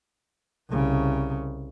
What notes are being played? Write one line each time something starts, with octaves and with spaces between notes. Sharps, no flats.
C2 C#3